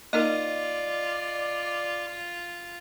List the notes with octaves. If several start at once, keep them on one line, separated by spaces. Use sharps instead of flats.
A#3 D#4 F4 A#4 D5 D#5